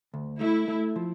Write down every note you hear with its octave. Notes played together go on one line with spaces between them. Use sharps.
D2
A3 E4
A3
F3